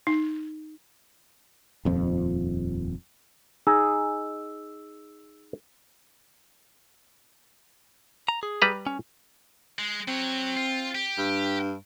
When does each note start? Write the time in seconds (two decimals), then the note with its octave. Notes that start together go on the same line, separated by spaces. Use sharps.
0.07 D#4
1.85 D#1 F2 F3
3.67 D#4 G#4 D#5 E6
8.29 A#5
8.43 G#4
8.62 G3 B4 A#5
8.87 C#4
9.79 G#3
10.08 F#3 C4 C#5
10.57 F4
10.95 G4
11.18 G2